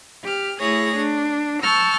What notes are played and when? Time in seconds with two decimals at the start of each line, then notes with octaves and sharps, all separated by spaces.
0.23 G4 F6
0.60 A3 E4 G#4 C#5 A#6
0.95 D4
1.62 A5 C#6 E6 F6 G6